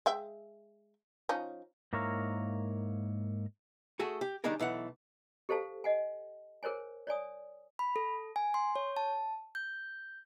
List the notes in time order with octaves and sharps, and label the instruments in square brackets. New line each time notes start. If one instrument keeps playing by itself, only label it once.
[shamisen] G#3 E5 G5
F3 C#4 D#4
[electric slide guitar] G#2 A#3 E4 A#4 C#5 F5
[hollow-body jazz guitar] A3 F#4 G#4 A4
G4
D#3 G3 D4 D#4 G#4 A#4
B1 E3 A3 F#5
[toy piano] G4 A4 C5 F5 A5
D#5 F#5 G#5
G#4 A#4 C5 C#5 G#5
C#5 D5 G#5 D#6
[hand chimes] B5
A4
G#5
C6
C#5
A5
G6